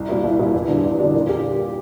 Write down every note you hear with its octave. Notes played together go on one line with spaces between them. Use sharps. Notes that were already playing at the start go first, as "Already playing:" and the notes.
Already playing: C2
A#2 G3 A#3 E4
C2
A#2 G3 A#3 E4
E2
D3 G3 D4
E2
D3 G3 D4
A#2
G4